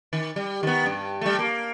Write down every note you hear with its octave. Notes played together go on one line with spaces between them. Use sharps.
D#3
G3
D#3 B3
G2
G3 A3
A#3